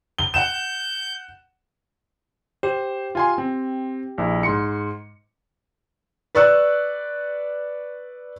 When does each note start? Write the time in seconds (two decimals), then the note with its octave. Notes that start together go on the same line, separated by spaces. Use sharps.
0.19 G7
0.34 F#5 G6 E7
2.63 G4 C5
3.15 F4 G#5 C6
3.38 C4
4.18 A#1 E4
4.43 G#2 C6 C#7
6.35 B4 D5 C#6 E6 F#6